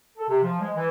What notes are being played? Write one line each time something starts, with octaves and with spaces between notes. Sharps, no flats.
A4
C3
F3
G#3
E3